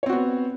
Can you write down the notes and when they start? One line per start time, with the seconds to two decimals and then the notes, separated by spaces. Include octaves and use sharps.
0.03 C#5
0.06 C4
0.09 F#4
0.12 B3